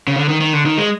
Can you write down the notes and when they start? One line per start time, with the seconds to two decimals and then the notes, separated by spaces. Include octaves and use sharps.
0.08 C#3
0.16 D3
0.29 D#3
0.41 D#3
0.53 D3
0.66 D#3
0.78 G#3